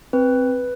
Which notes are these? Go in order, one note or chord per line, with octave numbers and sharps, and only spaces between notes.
C4 B4